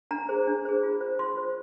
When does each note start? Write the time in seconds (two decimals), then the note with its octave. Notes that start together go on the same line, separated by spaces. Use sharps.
0.11 D4 A#5
0.29 G#4 C5
0.47 D4
0.65 G#4 C5
0.83 F4
1.01 C5
1.19 F4 C6
1.37 C5